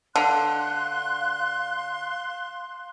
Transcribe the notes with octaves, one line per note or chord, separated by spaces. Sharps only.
D3 F5 C6 F#6